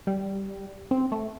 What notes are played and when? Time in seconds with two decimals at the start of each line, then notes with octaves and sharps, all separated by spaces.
0.07 G3
0.91 C4
1.12 A3